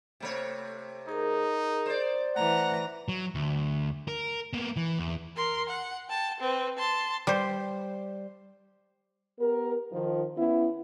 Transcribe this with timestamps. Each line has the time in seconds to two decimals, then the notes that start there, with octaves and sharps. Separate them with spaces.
0.20 C3 A3 C#5
1.09 D#4 G#4 A#4
1.86 C5 D5
2.36 E3 A3 B4 F#5 A#5
3.08 F#3
3.35 D2
4.08 A#4
4.53 A#3 B3
4.76 E3
4.99 E2
5.36 A#4 C6
5.69 F#5
6.09 G5 A5
6.40 C4 B4
6.77 A5 C6
7.27 G3 C5
9.39 B3 G4 A#4
9.93 D#3 F3
10.38 B3 C#4 E4